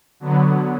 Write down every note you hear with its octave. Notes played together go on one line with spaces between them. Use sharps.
D3 F#3 B3